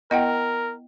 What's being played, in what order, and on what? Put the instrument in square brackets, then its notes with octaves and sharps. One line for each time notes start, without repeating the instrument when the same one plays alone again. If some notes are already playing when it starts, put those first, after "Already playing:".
[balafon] B3 E4 [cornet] A#4 [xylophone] D#5 F#5 G5